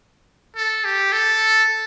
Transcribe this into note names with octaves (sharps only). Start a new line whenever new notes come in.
A4
G4
A4